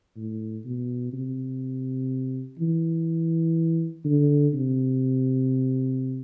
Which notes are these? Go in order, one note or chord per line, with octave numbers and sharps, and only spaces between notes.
A2
B2
C3
E3
D3
C3